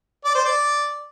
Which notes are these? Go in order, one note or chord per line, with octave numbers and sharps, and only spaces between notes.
D5
C5
D5